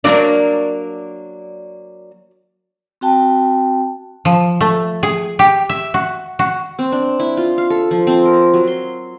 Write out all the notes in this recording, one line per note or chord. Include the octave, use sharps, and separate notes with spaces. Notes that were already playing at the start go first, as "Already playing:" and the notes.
F#3 A#3 D4 A#4 B4 D5
C4 F#4 G5 A5
F3
A3
G#4
G4
E5
F#4
F#4
C4
D4
E4
F4
F5
A4
F3
C4
A#4
F#3
C6